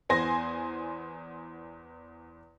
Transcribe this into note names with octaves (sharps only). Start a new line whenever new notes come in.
E2 B3 C5 G#5 C6 A#6